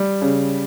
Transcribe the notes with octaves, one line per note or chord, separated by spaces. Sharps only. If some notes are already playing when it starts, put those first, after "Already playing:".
Already playing: G3
C#3